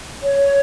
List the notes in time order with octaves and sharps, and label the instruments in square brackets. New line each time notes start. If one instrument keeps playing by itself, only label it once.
[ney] C#5